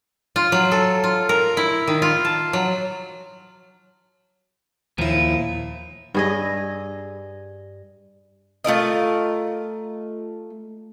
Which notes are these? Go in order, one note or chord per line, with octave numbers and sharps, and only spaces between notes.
F4
F#3
A4
F4
A#4
E4
D#3
F4
A5
F#3
D#2 A#2 F3 E4
G2 G#4 D#5
A3 F4 A#4 D#5